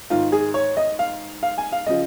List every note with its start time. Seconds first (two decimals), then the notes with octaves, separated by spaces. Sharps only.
0.10 G#2 D#3 F4
0.32 G#4
0.54 C#5
0.77 D#5
0.99 F5
1.43 F5
1.58 G#5
1.72 F5
1.86 C#3 F3 D#5